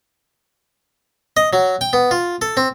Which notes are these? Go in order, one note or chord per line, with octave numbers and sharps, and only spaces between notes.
D#5
F#3
G5
B3
F4
A4
C4